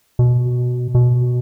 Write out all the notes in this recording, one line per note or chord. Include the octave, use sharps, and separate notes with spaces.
B2
B2